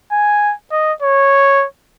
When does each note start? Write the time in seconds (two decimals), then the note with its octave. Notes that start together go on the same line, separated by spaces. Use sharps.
0.12 G#5
0.72 D#5
1.02 C#5